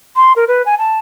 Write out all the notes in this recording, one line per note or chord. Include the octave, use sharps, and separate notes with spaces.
C6
A#4
B4
G#5
A5